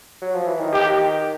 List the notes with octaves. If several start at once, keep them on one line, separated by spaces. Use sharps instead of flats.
F#3
F3
E3
D#3
G4